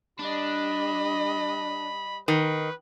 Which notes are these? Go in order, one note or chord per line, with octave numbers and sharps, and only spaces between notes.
G3 D4 D#5 B5
D#3 B4